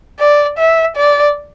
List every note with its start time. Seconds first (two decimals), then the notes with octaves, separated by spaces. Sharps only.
0.20 D5
0.58 E5
0.96 D5